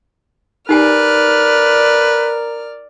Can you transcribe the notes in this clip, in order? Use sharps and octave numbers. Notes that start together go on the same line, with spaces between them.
D#4 G4 A#4 B4 D5 G#5 F6